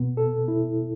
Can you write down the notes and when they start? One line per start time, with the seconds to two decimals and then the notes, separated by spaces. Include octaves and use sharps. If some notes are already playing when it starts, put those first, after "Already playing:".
Already playing: B2 B3
0.17 A4
0.48 E4